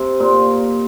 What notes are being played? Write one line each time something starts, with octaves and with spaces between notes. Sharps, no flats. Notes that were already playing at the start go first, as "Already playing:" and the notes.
Already playing: C3
A#2